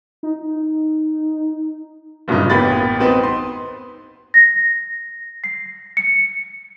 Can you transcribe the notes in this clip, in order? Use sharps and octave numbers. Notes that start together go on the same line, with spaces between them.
D#4
F#1 G2 A#2 C#3 D#4
A1 A#3 B3 G4 B5 A6
B3 C4 D#4 B4
C6
A#6
C7
C#7